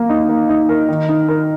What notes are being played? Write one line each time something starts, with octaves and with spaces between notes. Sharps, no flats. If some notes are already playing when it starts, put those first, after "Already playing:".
Already playing: A#3
D#4
A#3
D#4
A#4
D#3
D#4
A#4